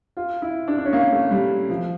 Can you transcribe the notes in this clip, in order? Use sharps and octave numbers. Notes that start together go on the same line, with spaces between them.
F4
E4
D4
D4
C#4
A#3
A3
G3
F3